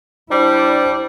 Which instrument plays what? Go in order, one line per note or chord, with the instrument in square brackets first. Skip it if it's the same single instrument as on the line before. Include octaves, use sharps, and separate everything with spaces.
[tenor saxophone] G3 [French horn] D4 [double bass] E4 [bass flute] C5